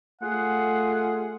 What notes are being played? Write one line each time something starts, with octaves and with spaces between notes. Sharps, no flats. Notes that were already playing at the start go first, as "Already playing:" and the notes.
A3 F4 G#4 F#5